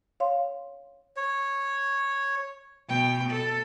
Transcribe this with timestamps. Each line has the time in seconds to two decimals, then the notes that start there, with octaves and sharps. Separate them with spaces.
0.20 C#5 F5 C6
1.17 C#5
2.89 B2 G5
3.31 A4